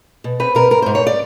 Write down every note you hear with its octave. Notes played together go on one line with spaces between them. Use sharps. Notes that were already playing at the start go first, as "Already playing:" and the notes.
B2
C4 B4
B2 A#4
G#2 A#4
G#2 C5
C#5
D5